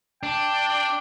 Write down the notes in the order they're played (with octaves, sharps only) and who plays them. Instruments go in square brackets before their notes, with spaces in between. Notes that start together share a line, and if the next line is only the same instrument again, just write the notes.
[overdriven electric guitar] D4 [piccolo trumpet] G5